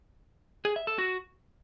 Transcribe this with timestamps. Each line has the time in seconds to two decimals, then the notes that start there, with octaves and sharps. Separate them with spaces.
0.65 G#4
0.76 E5
0.87 A4
0.98 F#4